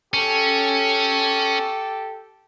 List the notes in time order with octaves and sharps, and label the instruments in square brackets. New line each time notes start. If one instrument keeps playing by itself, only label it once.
[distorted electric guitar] C#4 [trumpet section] G4 A4